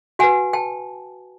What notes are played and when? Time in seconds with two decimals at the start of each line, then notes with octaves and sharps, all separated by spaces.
0.19 F#4 B4 F#5 G#5
0.53 G5 A5